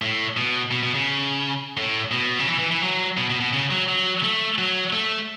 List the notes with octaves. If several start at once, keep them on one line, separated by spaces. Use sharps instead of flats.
A2
B2
B2
B2
C#3
A2
B2
C#3
E3
E3
E3
F#3
B2
B2
B2
C#3
F#3
F#3
A3
F#3
A3